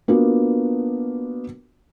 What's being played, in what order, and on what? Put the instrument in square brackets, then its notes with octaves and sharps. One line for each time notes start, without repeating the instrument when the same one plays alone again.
[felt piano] A#3 B3 D4 F4 F#4